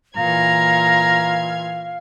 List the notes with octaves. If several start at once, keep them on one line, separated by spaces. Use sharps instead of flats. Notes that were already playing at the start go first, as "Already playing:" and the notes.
A#2 E3 F5 A#5 F6 G#6